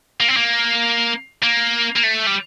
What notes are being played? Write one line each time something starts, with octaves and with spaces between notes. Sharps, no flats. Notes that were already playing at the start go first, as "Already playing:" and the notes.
A#3
C4
A#3
A#3
A#3
A3
G3